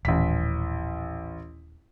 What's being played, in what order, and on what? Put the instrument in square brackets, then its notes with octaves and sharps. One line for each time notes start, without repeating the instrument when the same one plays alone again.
[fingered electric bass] D#1 [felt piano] A1 B6